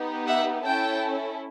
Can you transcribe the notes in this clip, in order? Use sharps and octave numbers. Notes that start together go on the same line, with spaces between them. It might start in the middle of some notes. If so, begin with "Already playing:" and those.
Already playing: B3 D#4 G4
E5 F#5
C#4 E4 A4 G5 A5